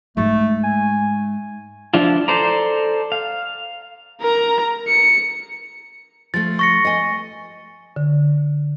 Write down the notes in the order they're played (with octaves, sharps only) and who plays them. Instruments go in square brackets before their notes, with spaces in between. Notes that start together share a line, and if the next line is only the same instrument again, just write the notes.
[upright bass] G#2 G#3 [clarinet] A3
[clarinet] G#5
[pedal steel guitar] F3 D4 E4 F4
A4 C5 D5 A#5
F5
[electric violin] A#4 A#5
C#7
[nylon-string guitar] F3 A3 [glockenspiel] A6
[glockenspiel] C#6 A#6 C#7
[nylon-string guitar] D#5 G#5
[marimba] D3